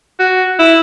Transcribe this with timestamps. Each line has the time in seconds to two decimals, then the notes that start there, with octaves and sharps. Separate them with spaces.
0.20 F#4
0.59 E4